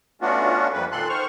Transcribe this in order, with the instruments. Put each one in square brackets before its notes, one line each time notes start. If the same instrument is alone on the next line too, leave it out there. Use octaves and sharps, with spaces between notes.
[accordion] A3 B3 C#4 D4 F4 F#4
F2 G3 A#3 B4
A#2 D#3 A4 C6 F#6
D#3 C5 C#6 F6